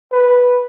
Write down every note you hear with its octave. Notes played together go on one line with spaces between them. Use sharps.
B4